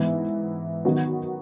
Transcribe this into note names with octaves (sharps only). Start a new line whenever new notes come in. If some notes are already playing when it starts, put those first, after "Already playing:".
Already playing: G#2 E3 B3 E4
D#3 F#3 B3 D#4 F#4